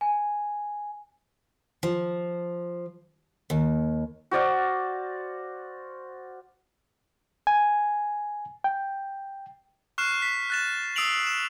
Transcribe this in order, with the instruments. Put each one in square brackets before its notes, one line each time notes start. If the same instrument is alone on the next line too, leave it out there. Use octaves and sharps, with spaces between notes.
[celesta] G#5
[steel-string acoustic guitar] F3
D#2
[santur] F#4 C5 D5 F5
[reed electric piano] G#5
G5
[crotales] C#6 F6 F#6 C7 E7
B6
F#6 A6 E7
D#6 E6 C7 D7 F7 F#7
E7